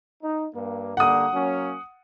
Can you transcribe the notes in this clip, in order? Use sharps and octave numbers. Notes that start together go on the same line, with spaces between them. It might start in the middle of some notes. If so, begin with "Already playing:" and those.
D#4
G2 A#3
D3 G3 A#3 F#5 D#6
F#3 A#3 C#4